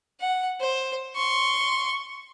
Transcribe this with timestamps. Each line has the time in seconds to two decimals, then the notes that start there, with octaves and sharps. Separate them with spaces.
0.20 F#5
0.60 C5
1.16 C6 C#6